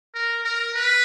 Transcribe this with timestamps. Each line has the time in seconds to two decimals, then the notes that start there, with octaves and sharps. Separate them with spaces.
0.14 A#4
0.44 A#4
0.75 B4